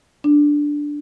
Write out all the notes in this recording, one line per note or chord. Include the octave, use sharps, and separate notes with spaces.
D4